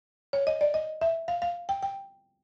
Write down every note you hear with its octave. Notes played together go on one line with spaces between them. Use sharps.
C#5
D#5
D5
D#5
E5
F5
F5
G5
G5